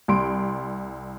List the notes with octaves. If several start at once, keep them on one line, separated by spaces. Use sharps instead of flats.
C2 C6 D7